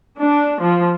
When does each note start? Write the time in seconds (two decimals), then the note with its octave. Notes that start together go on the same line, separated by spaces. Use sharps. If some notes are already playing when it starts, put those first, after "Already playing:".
0.18 D4
0.61 F3